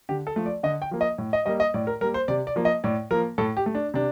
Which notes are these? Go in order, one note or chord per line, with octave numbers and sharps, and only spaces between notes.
D3 G4
A4
F3 A3
D5
D3 D#5
G5
F3 A#3
D#5
A2
D#5
G3 A#3 D#5
D#5
A2 D5
A#4
G3 A#3 A#4
C5
C3 D5
D5
F3 A#3
D#5
A2 D5
F3 A#3 A#4
A2 A4
G4
A3
D4
C3 D4